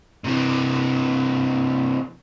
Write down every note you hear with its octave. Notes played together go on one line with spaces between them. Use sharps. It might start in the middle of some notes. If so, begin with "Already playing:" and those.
C3 E3